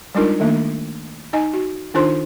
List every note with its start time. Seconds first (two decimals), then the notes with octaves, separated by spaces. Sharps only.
0.15 G3 G#3 D4 D#4 F4 A#4
0.40 D#3 A3 A#3 D4
1.33 D#4 D#5 G#5
1.53 F#4
1.94 D#3 D4 D#4 F4 C5 C6